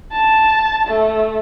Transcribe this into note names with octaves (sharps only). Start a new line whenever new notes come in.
A5
A3